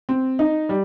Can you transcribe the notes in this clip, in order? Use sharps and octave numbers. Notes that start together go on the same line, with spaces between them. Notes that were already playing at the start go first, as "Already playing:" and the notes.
C4
D#4
G3